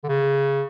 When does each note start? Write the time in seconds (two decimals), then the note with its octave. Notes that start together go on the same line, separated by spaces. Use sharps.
0.04 D3
0.08 C#3